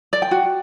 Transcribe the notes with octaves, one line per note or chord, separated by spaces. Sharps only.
D5
G5
F#4